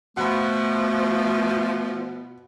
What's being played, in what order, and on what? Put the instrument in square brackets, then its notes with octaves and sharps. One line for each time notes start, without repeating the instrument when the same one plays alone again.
[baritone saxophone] B2 [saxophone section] F3 [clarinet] A3 [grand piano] F#5 B5